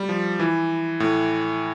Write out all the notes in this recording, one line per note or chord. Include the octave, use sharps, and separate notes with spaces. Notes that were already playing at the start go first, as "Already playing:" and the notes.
Already playing: G3
F3
E3
A2